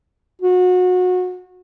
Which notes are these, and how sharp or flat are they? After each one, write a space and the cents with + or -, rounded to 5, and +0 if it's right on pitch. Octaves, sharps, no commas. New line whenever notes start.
F#4 -25